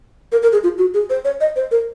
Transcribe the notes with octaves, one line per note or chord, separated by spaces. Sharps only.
A#4
A#4
G#4
F4
F#4
G#4
C5
C#5
D#5
C5
A#4